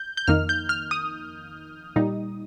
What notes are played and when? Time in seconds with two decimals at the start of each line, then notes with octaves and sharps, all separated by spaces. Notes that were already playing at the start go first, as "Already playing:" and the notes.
Already playing: G6
0.17 G6
0.27 F2 D#3 A#3 D#4 F6
0.49 G6
0.69 F6
0.91 D#6
1.96 A#2 G3 D#4